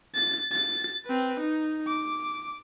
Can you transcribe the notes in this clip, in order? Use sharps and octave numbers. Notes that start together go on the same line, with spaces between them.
A6
A6
C4 B4
D#4
D6